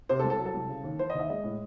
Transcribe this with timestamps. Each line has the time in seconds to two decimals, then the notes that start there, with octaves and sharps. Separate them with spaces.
0.09 C3 C5
0.19 A4
0.24 C2
0.30 A4
0.39 F#3
0.46 A4
0.54 C2
0.69 C#3
0.84 D#2
0.99 E3 C5
1.10 D#2 D#5
1.19 E5
1.29 G#3 D#5
1.44 A2